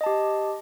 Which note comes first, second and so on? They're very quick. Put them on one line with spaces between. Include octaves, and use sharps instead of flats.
D#5 A5 G4